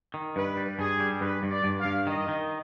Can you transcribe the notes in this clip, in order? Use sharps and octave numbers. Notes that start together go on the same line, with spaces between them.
D#3
G2 B4
G3
G2 G#4
G3
G2 B4
G2
D5
G2
F5
G2
D#3 D#5
D#3